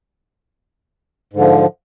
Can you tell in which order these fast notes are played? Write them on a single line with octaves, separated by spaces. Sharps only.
G#2 D3 F3